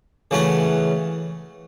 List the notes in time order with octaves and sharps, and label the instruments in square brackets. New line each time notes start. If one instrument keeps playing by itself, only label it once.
[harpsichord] C#3 E3 A3 C#4 F#4